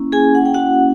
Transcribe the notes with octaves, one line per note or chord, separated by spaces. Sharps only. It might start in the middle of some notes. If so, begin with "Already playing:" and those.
Already playing: A#3 C#4 E4
G#4 G#5
F#5
G5
F#4 F#5